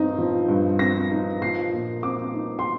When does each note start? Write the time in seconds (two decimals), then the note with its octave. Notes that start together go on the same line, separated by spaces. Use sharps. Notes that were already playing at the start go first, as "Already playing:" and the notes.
Already playing: G2 C4 D#4
0.18 F3
0.48 G2
0.79 C4 A#6
1.11 D#4
1.42 F3 C7
1.73 A#2
2.03 C4 D6
2.34 D#4
2.59 C6